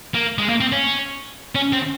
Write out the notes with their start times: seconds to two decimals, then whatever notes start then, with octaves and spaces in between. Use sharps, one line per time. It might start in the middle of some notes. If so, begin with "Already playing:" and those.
0.14 A#3
0.38 G#3
0.49 A#3
0.61 C4
0.72 C#4
1.55 C#4
1.73 C4